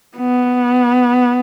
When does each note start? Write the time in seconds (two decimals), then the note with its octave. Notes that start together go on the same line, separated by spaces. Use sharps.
0.17 B3